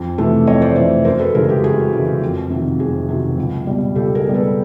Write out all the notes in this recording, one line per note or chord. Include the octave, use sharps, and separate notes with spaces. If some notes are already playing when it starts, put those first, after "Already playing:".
Already playing: F2
C3 E3 A3
F2 C#5 D#5
C5 D5
C3 E3 A3 C5 D5
F#2 A#4 C5
A4 B4
C#3 E3 G#3 G#4 A#4
G4 A4
F#2 F#4 G#4
C#3 E3 G#3
F2
C3 D#3 F#3
F2 F#4 G#4
C3 D#3 F#3
C#2
B2 G3
C#2 G4 A4
G#4 A#4
B2 G3
A4 B4